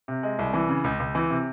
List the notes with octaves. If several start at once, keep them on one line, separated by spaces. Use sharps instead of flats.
C3
G#3
C2
E3
C#3
C#2
C#2
E3
C3